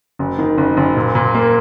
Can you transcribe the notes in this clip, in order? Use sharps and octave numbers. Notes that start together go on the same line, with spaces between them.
F#1
D#3
F#1
F#1
A#2
A#2
A#3